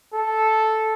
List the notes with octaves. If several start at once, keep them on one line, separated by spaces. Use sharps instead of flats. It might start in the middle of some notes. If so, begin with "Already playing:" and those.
A4